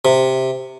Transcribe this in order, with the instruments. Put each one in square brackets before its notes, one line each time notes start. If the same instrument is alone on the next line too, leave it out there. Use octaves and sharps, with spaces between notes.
[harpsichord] C3